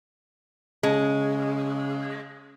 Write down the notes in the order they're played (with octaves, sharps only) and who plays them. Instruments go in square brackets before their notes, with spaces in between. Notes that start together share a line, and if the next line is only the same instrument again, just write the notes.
[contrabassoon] C#3 [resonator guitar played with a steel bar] G#3